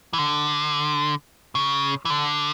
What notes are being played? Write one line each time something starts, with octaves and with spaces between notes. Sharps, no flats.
E3
D3
C#3
E3
D3